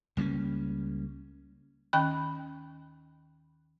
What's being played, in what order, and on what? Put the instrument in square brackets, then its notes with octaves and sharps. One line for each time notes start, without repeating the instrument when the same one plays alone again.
[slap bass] C#2 G3 A#3 C#4
[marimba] D#2 D#3 C#4 G5 B5 F#6